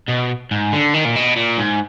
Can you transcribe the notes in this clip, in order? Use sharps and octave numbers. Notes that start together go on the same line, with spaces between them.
B2
G#2
D3
D#3
A#2
B2
A#2
G#2